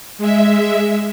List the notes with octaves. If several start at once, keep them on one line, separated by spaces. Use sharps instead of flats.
G#3 E5